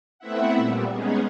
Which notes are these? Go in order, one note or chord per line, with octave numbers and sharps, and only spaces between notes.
A3 B3 C4 E4 E5 F#5
A#2 G3
G#3 B3 C#4 D#4 G#4